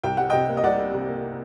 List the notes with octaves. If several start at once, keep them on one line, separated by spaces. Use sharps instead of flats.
C2 G5
G3 F#5
C3 D#5 G5
A#3
D#5
C2 D5 F#5
G3
C3
A#3